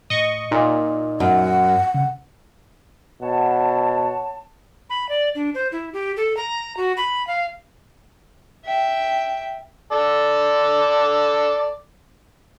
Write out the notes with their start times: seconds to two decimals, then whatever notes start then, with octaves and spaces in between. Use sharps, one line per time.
0.10 A2 D#5 C#6
0.51 A#2 D#4 D#5
1.20 F#2 F#5
1.94 C#3
3.22 B2 C#5 F#5 A5
4.90 B5
5.09 D5
5.35 D4
5.55 C5
5.72 E4
5.93 G4
6.17 A4
6.37 A#5
6.77 F#4
6.97 B5
7.27 F5
8.65 E5 G5
9.92 A4 D5